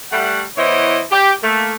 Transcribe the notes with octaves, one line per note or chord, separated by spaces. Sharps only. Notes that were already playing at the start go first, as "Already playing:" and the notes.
G3 A3 F#5
E3 B3 E4 C5 C#5 D#5
G4
A3 A#3